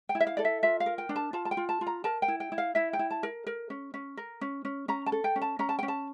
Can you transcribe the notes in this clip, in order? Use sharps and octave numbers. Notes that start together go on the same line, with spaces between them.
G5
E4
E5
F5
A4 D5
E5
F4 E5
F5
A#4
G5
D4
A5
F4 A5
A5
G5
F4
A5
F4
A#5
A#4 A5
G5
E4
G5
E4
F5
E4 E5
G5
E4
A5
A#4
A#4
C#4
C#4
A#4
C#4
C#4
C#4 A#5
A5
A4
G5
C#4
A5
C#4 A#5
A5
C#4 G5
A5